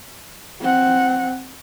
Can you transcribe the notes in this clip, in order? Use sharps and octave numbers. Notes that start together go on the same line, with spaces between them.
C4 F#5